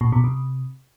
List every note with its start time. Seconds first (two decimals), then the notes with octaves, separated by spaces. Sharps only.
0.01 A#2
0.12 B2
0.24 C3